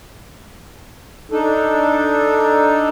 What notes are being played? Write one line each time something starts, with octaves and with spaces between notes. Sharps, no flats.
D4 D#4 A4